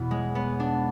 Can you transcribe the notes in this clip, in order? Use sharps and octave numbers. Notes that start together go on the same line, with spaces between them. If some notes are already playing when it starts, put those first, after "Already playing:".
Already playing: E2 B2 B3
G#3
B3
D4